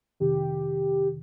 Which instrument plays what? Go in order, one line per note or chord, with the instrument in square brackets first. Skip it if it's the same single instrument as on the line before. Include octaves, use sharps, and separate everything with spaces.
[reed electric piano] F2 C3 D#3 [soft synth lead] G4